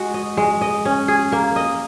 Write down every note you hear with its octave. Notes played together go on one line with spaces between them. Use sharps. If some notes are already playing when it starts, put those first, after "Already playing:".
Already playing: G#3 F#4
D#5
G#3
D#5
C#4
G#4
A#3
D#5